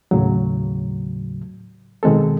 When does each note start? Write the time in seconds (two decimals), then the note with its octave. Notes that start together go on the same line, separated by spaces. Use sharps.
0.11 D#2 A2 C#3 F#3
2.03 B2 D#3 G#3 C4 A4